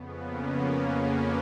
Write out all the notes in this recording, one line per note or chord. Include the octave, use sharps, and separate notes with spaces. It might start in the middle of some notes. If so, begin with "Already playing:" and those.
Already playing: F2 C#3 B3
A#3 C#4
A#3 C#4